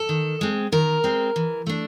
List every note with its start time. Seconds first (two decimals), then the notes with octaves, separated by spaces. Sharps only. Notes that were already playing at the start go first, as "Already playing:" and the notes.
Already playing: A4
0.09 D#3
0.41 G#3 C4
0.72 D#3 A#4
1.04 G#3 C4
1.36 E3
1.66 A3 D4